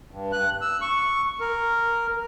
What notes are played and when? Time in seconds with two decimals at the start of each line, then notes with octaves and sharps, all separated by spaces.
0.11 G2
0.32 F#6
0.61 E6
0.82 C#6
1.40 A#4